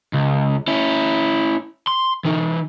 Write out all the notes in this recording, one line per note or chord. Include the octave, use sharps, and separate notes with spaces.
C#2
C#4 E4
C6
E3 D#4